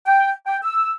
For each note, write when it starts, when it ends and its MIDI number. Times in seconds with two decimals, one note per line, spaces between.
0.06 0.31 79
0.47 0.57 79
0.63 0.92 88